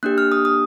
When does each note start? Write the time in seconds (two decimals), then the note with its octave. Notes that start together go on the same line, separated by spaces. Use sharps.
0.03 A#3 D4 G4 F#6
0.18 F6
0.32 D#6
0.45 D#6